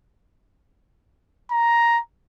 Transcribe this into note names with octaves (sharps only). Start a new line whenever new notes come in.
A#5